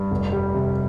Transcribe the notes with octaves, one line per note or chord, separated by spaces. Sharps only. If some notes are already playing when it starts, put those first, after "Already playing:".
Already playing: G2
F1
G3
C3